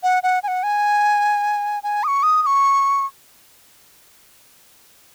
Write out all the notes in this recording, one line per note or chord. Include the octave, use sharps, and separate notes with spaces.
F#5
F#5
G#5
F#5
G#5
G#5
D#6
C#6
D#6
D#6
C#6